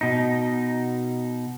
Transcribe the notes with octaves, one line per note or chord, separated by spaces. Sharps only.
B2 D#4